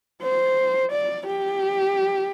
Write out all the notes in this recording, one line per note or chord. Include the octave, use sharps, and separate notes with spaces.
C5
D5
G4